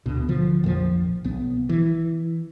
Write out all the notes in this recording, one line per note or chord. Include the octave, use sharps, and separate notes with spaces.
D2 B2 D3
D3 F3
A#1 F2 E3 F3
B1 B3
E3